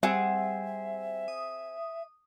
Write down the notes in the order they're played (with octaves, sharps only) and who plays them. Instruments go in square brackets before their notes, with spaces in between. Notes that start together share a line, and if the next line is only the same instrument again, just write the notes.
[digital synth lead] G3 [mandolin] C4 G#4 [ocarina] E5 [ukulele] F#5
[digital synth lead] D#6